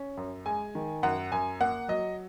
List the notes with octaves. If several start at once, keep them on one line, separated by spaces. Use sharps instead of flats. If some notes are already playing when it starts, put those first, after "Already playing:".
Already playing: C#4
F#2
G#3 G#5
D#3
F#2 F#5
F#2 G#5
A#3 F#5
F#3 D#5